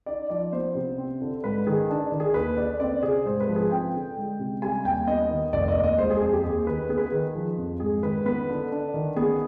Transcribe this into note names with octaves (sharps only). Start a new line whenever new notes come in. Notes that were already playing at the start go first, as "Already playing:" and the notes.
D#4 D5
F3 D5
B3 C5
C3
C4
D3
G#2 B4
D#3 G#4
D4
D#3
G#4
D#2 B4
D3 D5
C4 D5
C3 G#4
G#2 C5
B4
F3
G#4
C4 G5
D3
G#3
C3
G3 G#5
D#2 G5
B3 D#5
D#3
F1 D5
D#5
D#2
D#5
G#3 C5
G#4
F2 G#4
G4
D#2 G#4
D#3 B4
B3 G#4
B4
G#4
D#3
F3
F2
G#2 G#4
D#3 B4
B3 B4
D3
D4
D#3
B3 G#4